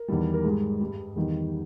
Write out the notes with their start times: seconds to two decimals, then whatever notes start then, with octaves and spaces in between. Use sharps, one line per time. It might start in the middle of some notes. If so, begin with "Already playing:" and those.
Already playing: A#4
0.08 E2 D#3 G3
0.34 A#4
0.44 G#2 G3 G#4
0.81 G2 G3
1.16 E2 D#3 G3 G4